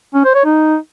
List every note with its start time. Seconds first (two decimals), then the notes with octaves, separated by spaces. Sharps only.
0.14 C#4
0.24 C5
0.35 C#5
0.45 D#4